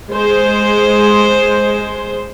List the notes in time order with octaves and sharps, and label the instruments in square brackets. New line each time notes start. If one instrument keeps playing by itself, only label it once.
[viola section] G#3 C5